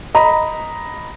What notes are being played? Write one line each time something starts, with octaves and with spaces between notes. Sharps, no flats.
D#5 A#5 B5